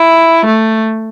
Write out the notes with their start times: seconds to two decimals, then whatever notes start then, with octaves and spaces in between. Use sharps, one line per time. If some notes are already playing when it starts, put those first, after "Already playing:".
Already playing: E4
0.46 A3